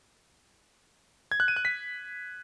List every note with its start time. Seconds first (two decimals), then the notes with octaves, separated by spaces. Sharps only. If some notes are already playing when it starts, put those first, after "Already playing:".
1.31 G#6
1.40 F#6
1.48 D#7
1.56 F#6
1.65 B6